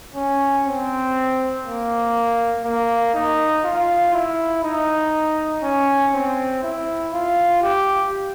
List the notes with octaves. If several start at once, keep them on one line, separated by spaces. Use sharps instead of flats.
C#4
C4
A#3
A#3
D#4
F4
E4
D#4
C#4
C4
E4
F4
G4